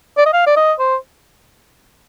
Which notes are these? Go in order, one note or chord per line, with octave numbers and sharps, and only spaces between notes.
D5
D#5
F5
D5
D#5
C5